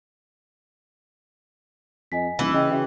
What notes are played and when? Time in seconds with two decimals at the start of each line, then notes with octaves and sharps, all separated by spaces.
2.12 F2 D#5 G#5 B6
2.39 D#1 E3
2.54 C#3 D#5 G5
2.71 C#3 F#4 E5 G5